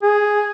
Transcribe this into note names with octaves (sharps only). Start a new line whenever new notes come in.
G#4